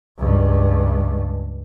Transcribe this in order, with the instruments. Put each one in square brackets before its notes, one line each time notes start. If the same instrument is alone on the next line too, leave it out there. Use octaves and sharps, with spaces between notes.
[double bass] C#2 G2